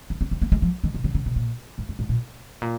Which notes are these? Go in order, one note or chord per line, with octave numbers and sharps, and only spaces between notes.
C4
C4
C4
A#3
G#3
F3
D#3
C3
C#3
C#3
C3
A#2
G#2
F#2
G#2
A#2
A#2